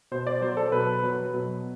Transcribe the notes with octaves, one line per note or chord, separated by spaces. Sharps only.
B2 C5
D5
F#3 C5
A4
B2 B4
F#3
B2